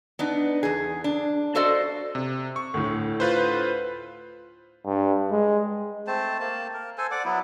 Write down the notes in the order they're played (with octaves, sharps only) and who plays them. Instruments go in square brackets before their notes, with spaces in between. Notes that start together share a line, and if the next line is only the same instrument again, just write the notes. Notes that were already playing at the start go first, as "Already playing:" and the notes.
[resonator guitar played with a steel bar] B3 D4 D#4
E2 G#4
D4
D4 F#4 A4 C5 D5 D#5
[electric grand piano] C3
C#6
[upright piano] D2 A2
[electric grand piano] F4 B4 C5
[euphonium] G2
G#3
[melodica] A3 C4 C5 A5
A#3 A5
A#4
A4 C5 G#5
D5 F#5 D6
F#3 B3 E4